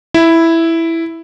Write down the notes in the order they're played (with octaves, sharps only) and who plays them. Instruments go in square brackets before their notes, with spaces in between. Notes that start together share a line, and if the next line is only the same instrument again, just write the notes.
[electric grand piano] E4